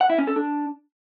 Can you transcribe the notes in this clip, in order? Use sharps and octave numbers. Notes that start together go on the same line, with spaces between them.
F#5
E4
C#4
A4
D4